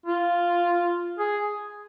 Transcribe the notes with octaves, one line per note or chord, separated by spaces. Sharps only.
F4
G#4